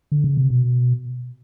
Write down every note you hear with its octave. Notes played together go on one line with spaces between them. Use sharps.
D3
C#3
C3
B2